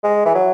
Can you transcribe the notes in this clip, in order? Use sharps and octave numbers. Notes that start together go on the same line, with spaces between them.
G#3
E3
F#3